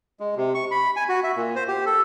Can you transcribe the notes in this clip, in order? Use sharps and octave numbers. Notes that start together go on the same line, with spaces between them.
G#3
C3
C#6
B5
G#5
F#4
E5
A#2
C5
G4
A4